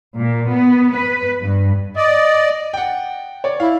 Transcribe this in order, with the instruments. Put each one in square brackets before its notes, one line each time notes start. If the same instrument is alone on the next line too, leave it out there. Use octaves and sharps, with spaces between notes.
[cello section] A#2
B3
B4
G2
[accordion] D5 [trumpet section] D#5
[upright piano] F#5 G5
C#5 D5
[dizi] E4 [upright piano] F5